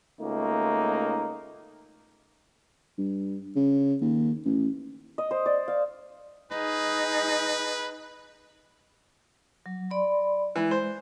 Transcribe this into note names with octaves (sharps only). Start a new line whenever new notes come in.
C#2 A3 A#3 D#4
G2
C#3
D#2
A1
D#5
C5
D5
F5
D#4 G#4 B4
F#3
D5 B5 C6
E3 G#3
C5